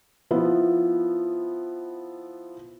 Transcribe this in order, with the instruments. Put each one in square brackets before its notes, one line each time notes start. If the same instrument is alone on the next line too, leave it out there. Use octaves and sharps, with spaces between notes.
[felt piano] F3 B3 E4